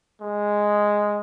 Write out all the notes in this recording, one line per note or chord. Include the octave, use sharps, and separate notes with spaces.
G#3